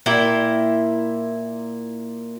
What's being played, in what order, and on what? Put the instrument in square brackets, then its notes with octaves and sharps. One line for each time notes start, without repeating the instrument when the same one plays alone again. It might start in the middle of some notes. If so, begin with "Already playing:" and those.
[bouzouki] A#2 E4 G5